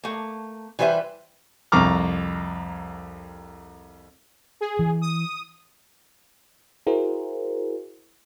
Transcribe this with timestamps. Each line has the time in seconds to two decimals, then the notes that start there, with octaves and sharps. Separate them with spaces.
0.03 A3 A#3
0.79 E3 G3 B4 C5 E5
1.72 C2 F2 A#5 C#6 D6 F6
4.61 G#4
4.79 E3
5.02 D#6
6.87 E4 F#4 G#4 A#4 C5